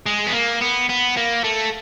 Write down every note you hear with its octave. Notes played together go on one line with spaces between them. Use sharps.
G#3
B3
A#3
B3
B3
A#3
A3